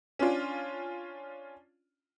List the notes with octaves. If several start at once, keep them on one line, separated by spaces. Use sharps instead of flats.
C#4 D4 F4